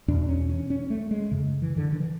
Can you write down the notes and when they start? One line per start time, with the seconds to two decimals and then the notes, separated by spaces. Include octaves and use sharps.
0.08 E2 B2 D4
0.29 C#4
0.49 C#4
0.70 C#4
0.90 A3
1.11 G#3
1.31 F#2 C#3
1.62 E3
1.77 D3
1.93 D#3
2.00 E3